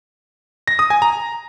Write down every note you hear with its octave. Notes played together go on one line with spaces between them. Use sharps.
A#6
D#6
G#5
A#5